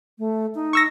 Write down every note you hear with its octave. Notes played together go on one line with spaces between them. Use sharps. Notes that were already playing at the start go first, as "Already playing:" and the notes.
A3
D#4
C#6 E6 A#6